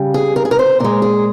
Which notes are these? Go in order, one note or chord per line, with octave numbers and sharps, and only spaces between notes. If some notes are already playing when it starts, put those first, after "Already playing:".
Already playing: C#3 G3
G#4
A#4
G#4
A#4
C5
A#2 G#3 A#4
G#4